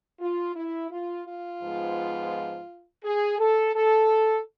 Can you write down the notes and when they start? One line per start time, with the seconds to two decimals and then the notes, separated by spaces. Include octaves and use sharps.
0.20 F4
0.55 E4
0.90 F4
1.26 F4
1.61 G#2 F3 G#3 B3
3.04 G#4
3.38 A4
3.74 A4